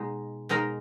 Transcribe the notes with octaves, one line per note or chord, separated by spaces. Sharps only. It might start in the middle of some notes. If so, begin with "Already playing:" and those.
Already playing: B2 G#3 D#4
B2 G#3 D#4 A#4